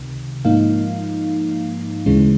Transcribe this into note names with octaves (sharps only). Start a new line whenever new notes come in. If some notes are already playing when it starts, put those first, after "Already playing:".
Already playing: C#2 C3 D#3
G#2 F3 A#3 D#4 F5
D2 C#3 E3 G#3 C#4